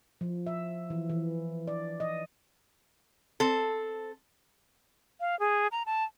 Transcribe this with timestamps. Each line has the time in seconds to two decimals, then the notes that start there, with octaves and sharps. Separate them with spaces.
0.21 F3
0.47 E5
0.90 E3
1.10 E3
1.67 D5
2.00 D#5
3.40 C4 A4
5.20 F5
5.40 G#4
5.72 A#5
5.86 A5